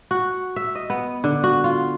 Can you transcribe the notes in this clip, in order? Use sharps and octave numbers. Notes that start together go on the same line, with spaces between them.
F#4
E5
D#5
B3
D3
F#4
F4